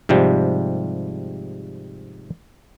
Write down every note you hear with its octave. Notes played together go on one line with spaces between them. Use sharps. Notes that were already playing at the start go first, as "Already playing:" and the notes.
G#2 C3 F3 G3